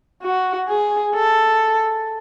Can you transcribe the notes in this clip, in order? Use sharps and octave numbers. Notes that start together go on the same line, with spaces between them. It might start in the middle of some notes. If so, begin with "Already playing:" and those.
F#4
G#4
A4